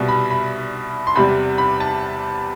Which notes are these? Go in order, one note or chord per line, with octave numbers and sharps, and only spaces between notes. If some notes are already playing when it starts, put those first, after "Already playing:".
Already playing: C2 B2 G3
B5
B5
C6
E2 C3 G3 B5
B5
A5